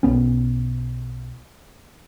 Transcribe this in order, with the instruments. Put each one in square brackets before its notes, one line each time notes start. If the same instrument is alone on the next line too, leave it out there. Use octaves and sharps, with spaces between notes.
[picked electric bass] B1 B3 C#4